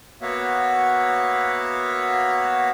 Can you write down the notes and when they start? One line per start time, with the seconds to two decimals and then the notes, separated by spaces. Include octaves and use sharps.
0.22 A#3 B3 F#4 C#5 E5 F5